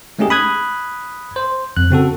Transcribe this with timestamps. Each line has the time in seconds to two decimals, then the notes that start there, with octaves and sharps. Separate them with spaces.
0.19 G#3 A3 C#4 D#4 G4 G#4
0.30 B5 D#6 F#6 G#6
1.36 C5
1.77 F2 F#6
1.90 C#3 C4 F#4 A4